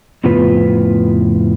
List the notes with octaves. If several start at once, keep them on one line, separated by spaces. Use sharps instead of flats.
F2 A2 C#3 B3 F4 B4